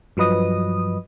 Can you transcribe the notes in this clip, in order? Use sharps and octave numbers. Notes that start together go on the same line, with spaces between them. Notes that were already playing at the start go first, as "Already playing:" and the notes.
G2 F3 F#3 B4 D#5 D#6